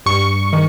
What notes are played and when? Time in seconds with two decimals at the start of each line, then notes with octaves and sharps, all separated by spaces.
0.06 G2 C#6
0.53 D#3